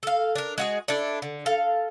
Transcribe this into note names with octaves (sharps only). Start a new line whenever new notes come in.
A4 F5
D4 A#4
G#3 F#4 G#4
D4 E4 A4 D5
D3
A4 F5